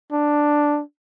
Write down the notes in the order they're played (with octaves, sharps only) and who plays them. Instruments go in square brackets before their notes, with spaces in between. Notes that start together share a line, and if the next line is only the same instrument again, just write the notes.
[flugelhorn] D4